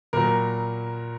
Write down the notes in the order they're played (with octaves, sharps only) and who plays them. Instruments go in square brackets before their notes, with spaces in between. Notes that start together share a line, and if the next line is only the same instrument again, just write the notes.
[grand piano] A#2 F#3 A#4